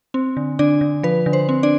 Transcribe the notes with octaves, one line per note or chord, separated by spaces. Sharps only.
C4
D3
D3 D4 D5
D3
F3 B4
D3
C5
C4
D4 D5